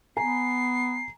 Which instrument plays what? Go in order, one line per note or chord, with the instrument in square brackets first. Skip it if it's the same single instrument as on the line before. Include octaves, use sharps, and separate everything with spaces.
[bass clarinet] B3 [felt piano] G#5 A#5 [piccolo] C7